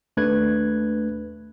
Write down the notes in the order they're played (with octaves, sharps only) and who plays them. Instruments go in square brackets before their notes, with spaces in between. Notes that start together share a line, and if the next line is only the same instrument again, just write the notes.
[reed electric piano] D#2 A3 D4 B4 F#6 G#6